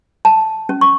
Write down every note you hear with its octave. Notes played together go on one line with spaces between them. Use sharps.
A5
C#4
C#6